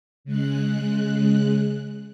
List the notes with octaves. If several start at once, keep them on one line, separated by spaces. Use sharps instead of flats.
C#3 G#3 F#6